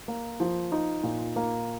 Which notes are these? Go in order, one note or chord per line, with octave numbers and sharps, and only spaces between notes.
A#3
F3
D#4
A#2
A#3